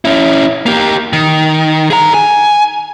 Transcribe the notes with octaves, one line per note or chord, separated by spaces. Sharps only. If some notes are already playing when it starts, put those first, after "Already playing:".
C#4 E4
A#3 G4
D#3
G#4 A#5
G#5